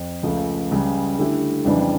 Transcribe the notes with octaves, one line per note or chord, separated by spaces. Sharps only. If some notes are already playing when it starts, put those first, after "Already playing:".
Already playing: F2
C#2 C#3 F3 A3
C#2 C#3 G3
D3 A3 E4 G4
F2 C#3 E3 G3 D4